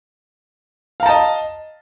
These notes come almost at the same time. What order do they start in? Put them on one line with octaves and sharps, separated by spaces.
F5 A#5 A5 D#5